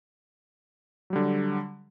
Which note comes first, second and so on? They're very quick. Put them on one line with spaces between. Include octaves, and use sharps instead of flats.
F#3 G3 D3